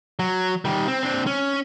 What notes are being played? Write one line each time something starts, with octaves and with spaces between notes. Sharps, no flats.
F#3
D#3 G3
C4
C4 D4
C#4